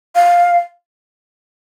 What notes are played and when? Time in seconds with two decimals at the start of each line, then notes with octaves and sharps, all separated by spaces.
0.15 F5